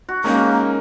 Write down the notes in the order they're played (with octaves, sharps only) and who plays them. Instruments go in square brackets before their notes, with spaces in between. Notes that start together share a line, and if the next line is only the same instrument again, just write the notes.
[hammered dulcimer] F#4
[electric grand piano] G#3 C#4 D#4 [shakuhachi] A#3 [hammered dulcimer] A#4 G5